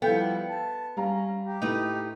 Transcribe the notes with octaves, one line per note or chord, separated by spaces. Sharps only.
F3 G3 B3 E4 A4 F5 G5 G6
A5
G3 C#4 F5 A#5
G4
A2 A3 D#4 B4